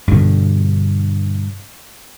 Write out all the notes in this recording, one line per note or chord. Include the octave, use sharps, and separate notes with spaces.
G2 B2 D3